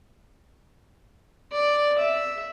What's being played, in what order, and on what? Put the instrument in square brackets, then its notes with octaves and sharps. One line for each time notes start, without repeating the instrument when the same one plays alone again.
[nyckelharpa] D5
E5